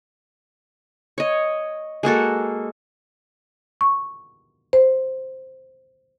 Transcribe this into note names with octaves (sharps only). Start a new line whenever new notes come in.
C#5 D#5
G#3 A#3 F#4 A4
C#6
C5